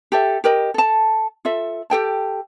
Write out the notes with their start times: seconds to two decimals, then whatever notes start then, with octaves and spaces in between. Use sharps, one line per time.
0.12 G4 A4 E5
0.44 G4 A#4 D#5
0.74 A4 A5
1.45 F4 A4 E5
1.90 G4 A4 G5 A5